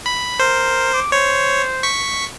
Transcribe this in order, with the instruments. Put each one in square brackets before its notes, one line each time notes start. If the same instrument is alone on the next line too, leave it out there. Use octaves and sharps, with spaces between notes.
[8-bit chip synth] B5
[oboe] A#4 [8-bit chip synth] C5
[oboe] D6
[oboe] C5 [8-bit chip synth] C#5
[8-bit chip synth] C#6 B6